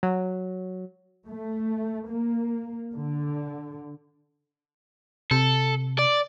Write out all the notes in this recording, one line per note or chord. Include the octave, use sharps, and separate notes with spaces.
F#3
A3
A#3
D3
C3 A4
D5